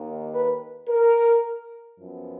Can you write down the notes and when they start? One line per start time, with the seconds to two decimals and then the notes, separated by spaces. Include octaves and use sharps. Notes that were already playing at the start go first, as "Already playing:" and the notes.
Already playing: D#2 D#3 A#3
0.33 B4
0.88 A#4
1.97 F#2 F3 B3